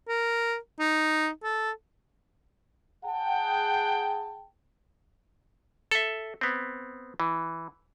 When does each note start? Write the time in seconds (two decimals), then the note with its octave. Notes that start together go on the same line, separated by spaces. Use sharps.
0.08 A#4
0.79 D#4
1.43 A4
3.05 G#4 F#5 G5 A5
5.91 A4 E5
6.41 B3 C4
7.20 E3